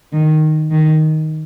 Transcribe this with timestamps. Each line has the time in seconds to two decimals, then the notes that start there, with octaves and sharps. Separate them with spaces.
0.13 D#3
0.71 D#3